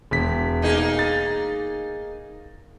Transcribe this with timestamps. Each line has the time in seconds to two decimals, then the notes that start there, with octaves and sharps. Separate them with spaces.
0.11 E1 B6
0.62 A#3 D#4 G#4
0.99 A6